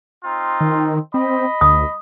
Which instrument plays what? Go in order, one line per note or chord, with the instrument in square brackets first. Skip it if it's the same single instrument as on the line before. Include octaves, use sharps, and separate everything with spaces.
[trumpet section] C4 D#4 F4
[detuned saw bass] D#3
[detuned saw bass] C4 [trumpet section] D#5 B5
[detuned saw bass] D2 [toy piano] D#6